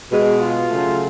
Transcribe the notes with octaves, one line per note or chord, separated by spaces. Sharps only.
B2 G#3
F4
C#3 F#3 A3